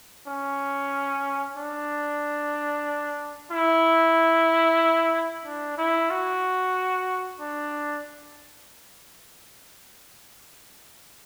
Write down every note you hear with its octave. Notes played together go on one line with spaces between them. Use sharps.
C#4
D4
E4
D4
E4
F#4
D4